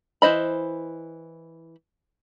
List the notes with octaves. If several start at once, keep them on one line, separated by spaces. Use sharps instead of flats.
E3 C5 D#5 B5